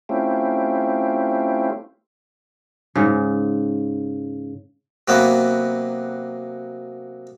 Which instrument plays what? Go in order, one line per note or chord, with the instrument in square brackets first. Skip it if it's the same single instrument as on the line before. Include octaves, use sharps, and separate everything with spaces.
[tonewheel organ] A3 C4 C#4 E4 F4 G4
[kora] G#2 C#3
[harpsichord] C3 F#3 A#3 B3